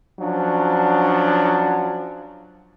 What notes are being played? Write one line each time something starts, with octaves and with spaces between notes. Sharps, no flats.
F3 F#3 C#4 D4